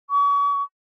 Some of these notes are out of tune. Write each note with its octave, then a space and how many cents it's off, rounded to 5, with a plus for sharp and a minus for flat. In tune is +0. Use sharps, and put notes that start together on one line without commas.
C#6 +40